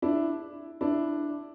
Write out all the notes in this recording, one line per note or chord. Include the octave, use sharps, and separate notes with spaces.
D4 E4
D4 E4